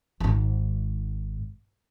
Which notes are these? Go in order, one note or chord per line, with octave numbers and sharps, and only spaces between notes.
G#1 G#2